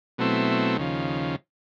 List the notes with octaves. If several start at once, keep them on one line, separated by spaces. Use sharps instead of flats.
B2 F#3 A3 C4 E4
D#2 C#3 F3